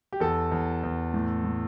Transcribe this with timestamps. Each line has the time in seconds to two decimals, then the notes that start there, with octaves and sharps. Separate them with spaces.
0.13 G4
0.20 E2 A4
0.52 E2
0.84 E2
1.14 A2
1.45 A2